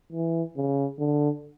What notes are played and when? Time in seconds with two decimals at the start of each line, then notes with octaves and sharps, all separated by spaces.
0.12 E3
0.57 C#3
0.99 D3